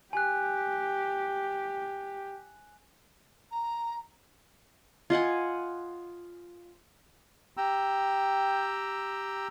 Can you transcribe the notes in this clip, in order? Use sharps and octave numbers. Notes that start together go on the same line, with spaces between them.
G4 G#5 F#6
A#5
F4 D#5 F#5 G#5
G4 G5 A#5 E6